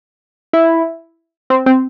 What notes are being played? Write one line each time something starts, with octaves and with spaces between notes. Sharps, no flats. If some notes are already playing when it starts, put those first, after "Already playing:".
E4
C4
C4